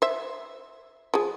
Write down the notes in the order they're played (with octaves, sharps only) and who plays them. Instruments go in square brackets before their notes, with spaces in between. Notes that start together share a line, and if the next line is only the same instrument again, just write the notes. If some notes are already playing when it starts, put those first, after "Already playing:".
[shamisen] C5 E5
F3 G#4